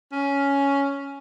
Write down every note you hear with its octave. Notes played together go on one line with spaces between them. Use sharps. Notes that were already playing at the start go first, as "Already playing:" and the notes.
C#4